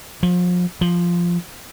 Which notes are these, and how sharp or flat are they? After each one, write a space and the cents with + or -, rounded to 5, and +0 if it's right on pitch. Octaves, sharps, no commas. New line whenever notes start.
F3 +35
F3 -5